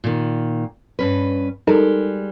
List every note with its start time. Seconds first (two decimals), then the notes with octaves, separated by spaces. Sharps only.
0.04 A#2 D#3
0.99 G2 C#4 B4
1.67 G3 G#3 D#4 A4 A#4